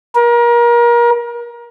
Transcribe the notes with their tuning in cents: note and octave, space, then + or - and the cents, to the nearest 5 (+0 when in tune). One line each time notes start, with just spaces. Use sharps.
A#4 +30